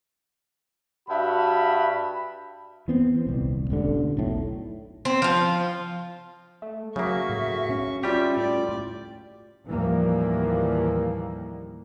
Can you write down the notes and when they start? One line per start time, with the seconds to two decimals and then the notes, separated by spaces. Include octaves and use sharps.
1.09 G2 F#4 E5 B5
2.88 E3 B3 C4
3.27 D#1 C2
3.70 E1 A1 D3
4.17 B1 A2
5.05 C4
5.22 F3 F4
6.62 A3
6.96 C#3 F#3 A#3 F#4 E5 C#6
7.29 A2
7.70 C#4
8.03 G3 C#4 F4 G4 E5
8.37 A2 D5
9.69 D#2 A2 E3 F3 G3 A#3